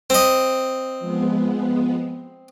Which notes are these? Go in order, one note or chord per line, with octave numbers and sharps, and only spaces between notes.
C4 D#5
F3 G#3 B3